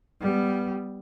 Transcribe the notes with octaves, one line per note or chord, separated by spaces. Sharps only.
G3 B3